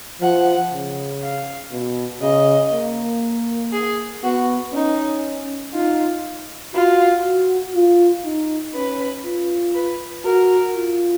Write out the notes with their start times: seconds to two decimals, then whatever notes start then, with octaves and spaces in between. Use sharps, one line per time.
0.21 F3 F#5
0.72 C#3
1.22 F5
1.72 B2
2.22 C#3 D#5
2.72 A#3
3.73 G#4
4.23 B3 F#4
4.73 C#4 D#4
5.73 D#4 F4
6.74 F4 F#4
7.25 F#4
7.75 F4
8.25 D#4
8.75 C#4 B4
9.25 F4
9.75 B4
10.25 F#4 A#4
10.75 F4